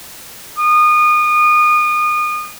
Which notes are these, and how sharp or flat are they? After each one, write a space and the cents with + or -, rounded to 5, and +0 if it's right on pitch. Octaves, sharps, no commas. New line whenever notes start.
D#6 -30